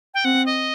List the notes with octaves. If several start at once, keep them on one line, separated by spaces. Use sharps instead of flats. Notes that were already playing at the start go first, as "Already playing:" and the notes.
G5
C4 F#5
D#5